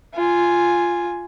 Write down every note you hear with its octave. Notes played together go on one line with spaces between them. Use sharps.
F4 G#5